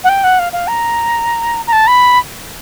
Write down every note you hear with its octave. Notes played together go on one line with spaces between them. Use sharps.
F#5
G5
F#5
F5
F5
A#5
A#5
A5
B5